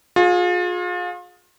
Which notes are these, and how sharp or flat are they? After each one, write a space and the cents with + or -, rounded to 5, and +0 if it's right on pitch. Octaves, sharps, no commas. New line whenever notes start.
F4 +35 G#4 +10